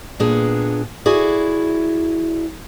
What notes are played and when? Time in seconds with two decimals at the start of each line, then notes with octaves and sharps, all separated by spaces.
0.20 A#2 B3 D4 G#4 G5
1.06 E4 F#4 G#4 D5